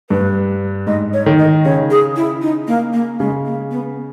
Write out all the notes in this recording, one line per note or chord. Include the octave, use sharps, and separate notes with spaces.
G2 B4
G#2 D#5
C#5
D#3
D#5
C#3 C#5
G#4
E4
D#4
A#3
A#3
C#3 G#3
A#3
B3